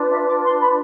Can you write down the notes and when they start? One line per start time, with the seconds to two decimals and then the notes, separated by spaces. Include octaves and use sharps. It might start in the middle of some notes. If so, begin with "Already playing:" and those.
Already playing: D4 F4 B4
0.10 E5
0.27 D6
0.43 C6
0.60 B5